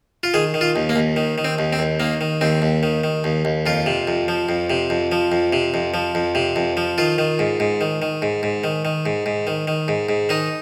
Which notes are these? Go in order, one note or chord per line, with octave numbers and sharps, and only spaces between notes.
F4
D#3 G#4
D#3
F4
D#2
A#3
D#2
D#3
D#3
C4
D#2
C4
D#2
D#3 A#3
D#3
D#2 C4
D#2
D#3
D#3
D#2
D#2
F2 F4
C3
F2
F3
F2
C3
F2
F3
F2
C3
F2
F3
F2
C3
F2
F3
D#3 F4
D#3
G#2
G#2
D#3
D#3
G#2
G#2
D#3
D#3
G#2
G#2
D#3
D#3
G#2
G#2
D#3 D#4